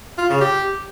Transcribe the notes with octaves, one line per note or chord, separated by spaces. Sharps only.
F4
C#3
G4